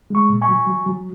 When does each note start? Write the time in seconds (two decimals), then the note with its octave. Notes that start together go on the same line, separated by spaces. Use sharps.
0.10 G#3 C#6
0.29 A#2
0.42 G#5 C#6
0.48 F#3
0.66 F#3
0.86 F#3